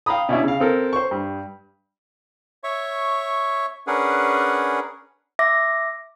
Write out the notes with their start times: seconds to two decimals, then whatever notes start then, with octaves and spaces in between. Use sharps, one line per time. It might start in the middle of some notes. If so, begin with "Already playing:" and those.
0.06 F5 G5 A#5 B5 D#6
0.29 B2 C#4 D4 E4
0.44 C#3 F5
0.60 C4 A4 A#4
0.93 C5 C#6
1.11 G2
2.64 C#5 E5 C#6
3.87 C#4 D4 G#4 A#4 B4 F#5
5.39 E5 D6 A#6